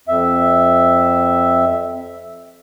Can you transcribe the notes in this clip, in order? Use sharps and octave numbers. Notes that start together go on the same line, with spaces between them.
F2 E5